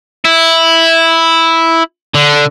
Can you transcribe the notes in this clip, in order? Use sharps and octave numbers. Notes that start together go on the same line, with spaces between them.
E4
D3